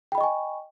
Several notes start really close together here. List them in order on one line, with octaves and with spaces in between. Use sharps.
G5 B5 D#5 C#6 G#5